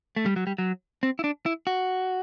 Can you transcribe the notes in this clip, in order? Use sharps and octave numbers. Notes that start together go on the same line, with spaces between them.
A3
G3
F#3
G3
F#3
C4
E4
D4
E4
F#4